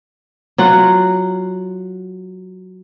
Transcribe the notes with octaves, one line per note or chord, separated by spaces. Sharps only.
F#3 F4 F#5